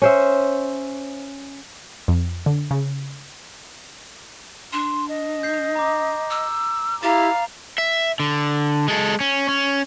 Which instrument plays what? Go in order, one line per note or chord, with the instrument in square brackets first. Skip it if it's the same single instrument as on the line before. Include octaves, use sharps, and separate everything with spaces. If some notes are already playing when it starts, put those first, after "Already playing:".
[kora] C#4 C5 E5
[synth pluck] F2
D3
C#3
[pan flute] D4 [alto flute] C6
[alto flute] D#5
[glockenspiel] G6 C7
A#5 D6
[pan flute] E6
[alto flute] E4 [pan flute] G4 [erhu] F5 [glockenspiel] A#5 A6
[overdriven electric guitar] E5
D3
G#3 A4
C#4
C#4